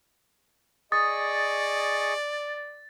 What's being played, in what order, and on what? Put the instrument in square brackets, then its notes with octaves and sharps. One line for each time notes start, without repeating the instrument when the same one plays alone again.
[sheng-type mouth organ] G#4 D#5 C#6 [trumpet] D5 [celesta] D#6 [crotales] A6